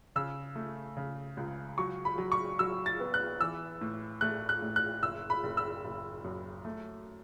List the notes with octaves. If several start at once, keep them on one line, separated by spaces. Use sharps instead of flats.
C#3 E6
A3
C#3
C#2
F#3 C#6
B5
F#3
C#6
F#3 E6
A6
B3
F#6
E3 E6
A2
A3 F#6
F#6
A2
F#6
F#1 E6
B5
F#1
E6
F#1
F#2
A3